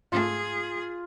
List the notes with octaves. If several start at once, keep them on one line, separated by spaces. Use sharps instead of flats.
G#2 A3 F4 G#4